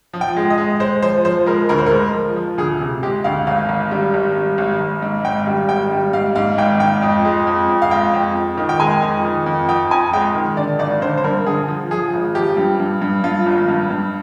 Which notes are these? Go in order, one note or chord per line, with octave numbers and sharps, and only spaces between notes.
F3
G5
G#3
D#5
G#3
G#3 C5
F3 C5
F3 C5
G#3 A#4
D2 A#4
C5
G#3 A#4
F3
F3
D2 G#4
C3
G#3 G4
D2 F5
G#1 F5
G#1
G3
G#1
G3
G#1
G#1
G#2
G#1 G5
G3
G#1 G5
G3
G#2 F5
G#2 F5
G#1 G5
G#2 G5
F2
G#3
F2
F2
F5
G#3 G5
F2
F2
D#3
G5
G#3 G#5
F2
D#3
F2
F2 G5
F2 G#5
G#3 G5
D#3
D3 D5
G#1 D5
D3 C5
C5
G2 A#4
D3 G#4
F3
F3 G#4
G#1
F3 G4
G2
G2
G2
G2 F4
G#1
G2
G2